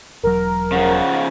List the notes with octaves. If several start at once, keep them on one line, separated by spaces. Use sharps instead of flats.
E1 F#3 A#4
C#3 F3 F#5